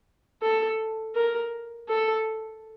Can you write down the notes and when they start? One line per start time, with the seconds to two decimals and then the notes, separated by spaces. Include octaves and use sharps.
0.42 A4
1.15 A#4
1.88 A4